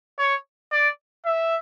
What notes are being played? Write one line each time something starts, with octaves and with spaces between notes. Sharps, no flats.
C#5
D5
E5